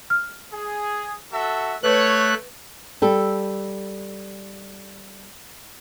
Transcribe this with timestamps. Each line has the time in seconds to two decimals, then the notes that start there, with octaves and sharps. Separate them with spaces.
0.10 F6
0.53 G#4
1.32 F#4 A4 E5
1.83 A3 B4 C#5 F#6
3.02 G3 A4